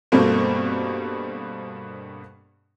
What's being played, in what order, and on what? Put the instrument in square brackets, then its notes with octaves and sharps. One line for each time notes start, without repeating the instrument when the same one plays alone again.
[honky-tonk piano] G2 B2 G3 A3 A#3 C4